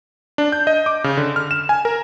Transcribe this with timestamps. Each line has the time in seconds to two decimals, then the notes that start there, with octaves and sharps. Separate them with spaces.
0.38 D4
0.52 G6
0.67 D#5
0.86 D6
1.04 C#3
1.17 D3
1.36 F6
1.51 E7
1.69 G#5
1.85 A#4